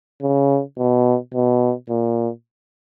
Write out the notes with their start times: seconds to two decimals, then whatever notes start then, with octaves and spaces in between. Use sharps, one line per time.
0.22 C#3
0.78 B2
1.34 B2
1.90 A#2